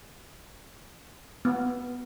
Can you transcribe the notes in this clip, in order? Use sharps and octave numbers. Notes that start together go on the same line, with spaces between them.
B3